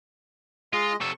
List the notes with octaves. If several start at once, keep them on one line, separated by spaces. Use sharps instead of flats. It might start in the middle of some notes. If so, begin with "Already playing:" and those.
G#3 F4 D#5
C3 A4 C#6